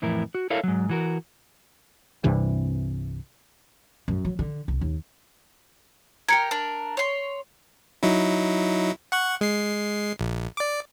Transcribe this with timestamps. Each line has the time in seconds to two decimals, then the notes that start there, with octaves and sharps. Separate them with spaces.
0.02 F2 A2 E3 E4 A#4
0.35 F#4
0.50 E4 A4 A#4 C#5 E5 F5
0.64 G#2 F#3
0.89 E3 F#4 A#4
2.24 C2 G2 C3 E3
4.08 F#2
4.25 F#3
4.39 D3
4.68 C2
4.81 D#2
6.28 G4 A#4 G#6 C#7
6.51 D4 A#4
6.97 C#5 C6
8.03 F#3 D#4 E4
9.12 F#5 C#6 F#6
9.41 G#3 C7
10.19 A#1
10.57 D5 D6